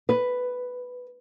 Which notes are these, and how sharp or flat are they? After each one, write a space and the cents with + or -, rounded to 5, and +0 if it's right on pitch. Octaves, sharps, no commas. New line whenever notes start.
B4 +5